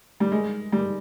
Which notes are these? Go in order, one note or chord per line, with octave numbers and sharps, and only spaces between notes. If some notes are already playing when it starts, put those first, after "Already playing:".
G3
G#3
G3